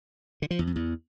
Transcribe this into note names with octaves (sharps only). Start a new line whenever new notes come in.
D3
F3
E2
F2
E2